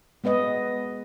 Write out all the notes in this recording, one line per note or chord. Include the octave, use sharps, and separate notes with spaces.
G#3 B3 B4 D#5